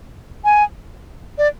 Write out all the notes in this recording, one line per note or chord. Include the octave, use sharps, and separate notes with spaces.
G#5
D5